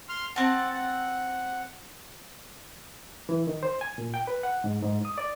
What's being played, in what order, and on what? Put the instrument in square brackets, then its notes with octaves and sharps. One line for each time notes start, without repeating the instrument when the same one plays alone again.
[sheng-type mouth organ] C6 F6
[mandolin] C4 A5 [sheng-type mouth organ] F#5
[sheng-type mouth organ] F#5
[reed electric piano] E3
D#3
C5
G#5
A#2
G5
B4
F#5
G#2
G#2
D#6
D5